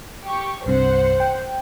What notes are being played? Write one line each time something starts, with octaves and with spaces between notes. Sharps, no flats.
G4 C#6
C2 G2 C3 C5 F#5
G5